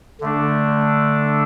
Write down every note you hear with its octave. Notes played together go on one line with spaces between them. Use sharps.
D3 A3 D4